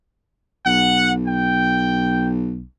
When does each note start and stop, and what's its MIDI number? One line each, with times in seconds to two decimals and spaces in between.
0.66 2.64 35
0.66 1.12 78
1.28 2.30 79